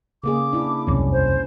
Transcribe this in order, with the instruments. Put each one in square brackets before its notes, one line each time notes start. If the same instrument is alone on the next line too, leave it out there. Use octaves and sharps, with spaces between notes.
[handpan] C#3 A#3 G#4 [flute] D6
[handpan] D4 E4
[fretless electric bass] E1 C2 F#2 [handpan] C#4
[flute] C5